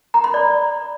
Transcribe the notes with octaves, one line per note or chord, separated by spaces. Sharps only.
A#5
B5
D5